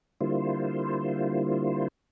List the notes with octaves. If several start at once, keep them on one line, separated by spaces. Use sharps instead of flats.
D3 G3 A#3 E4 F4 C5